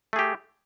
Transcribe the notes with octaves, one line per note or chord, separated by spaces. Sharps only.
A3 G4 G#4